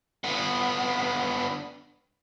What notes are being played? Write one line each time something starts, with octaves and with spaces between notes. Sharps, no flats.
D3 B3